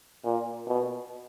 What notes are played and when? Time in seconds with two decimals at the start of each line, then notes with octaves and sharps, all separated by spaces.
0.25 A#2
0.67 B2